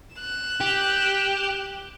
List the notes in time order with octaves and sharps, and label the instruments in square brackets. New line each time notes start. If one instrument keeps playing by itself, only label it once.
[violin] F#6 E7
[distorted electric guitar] G4